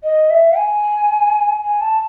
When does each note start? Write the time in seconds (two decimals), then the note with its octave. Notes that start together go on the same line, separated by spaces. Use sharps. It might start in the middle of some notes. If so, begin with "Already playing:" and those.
0.04 D#5
0.30 E5
0.57 G#5
1.64 G#5
1.81 A5